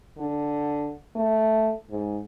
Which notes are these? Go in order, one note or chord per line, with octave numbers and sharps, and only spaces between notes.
D3
A3
G#2